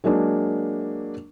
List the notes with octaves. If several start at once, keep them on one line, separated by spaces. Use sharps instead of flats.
F#3 G#3 A#3 D4